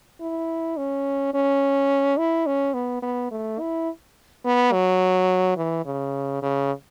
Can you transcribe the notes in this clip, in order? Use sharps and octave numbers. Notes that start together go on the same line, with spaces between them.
E4
C#4
C#4
E4
C#4
B3
B3
A3
E4
B3
F#3
E3
C#3
C#3